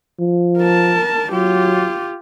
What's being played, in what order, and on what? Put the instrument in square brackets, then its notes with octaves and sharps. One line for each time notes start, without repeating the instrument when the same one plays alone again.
[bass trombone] F3
[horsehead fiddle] A#4 A5
[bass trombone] F#3 [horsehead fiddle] F4 G4